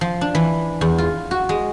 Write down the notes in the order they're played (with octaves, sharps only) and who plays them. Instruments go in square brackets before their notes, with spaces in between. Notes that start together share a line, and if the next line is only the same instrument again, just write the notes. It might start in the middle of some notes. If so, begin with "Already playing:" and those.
[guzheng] F3
D4
E3
E2
F4
F#4
G#3